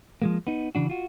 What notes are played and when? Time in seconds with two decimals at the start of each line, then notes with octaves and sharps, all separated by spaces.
0.22 F3 G#3 A#3
0.47 B3 D#4
0.75 C#3 E3 D4 F#4
0.90 F4 F#4